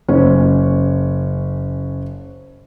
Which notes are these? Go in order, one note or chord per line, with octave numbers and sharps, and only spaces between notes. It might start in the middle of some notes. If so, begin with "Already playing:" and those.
F#1 C#4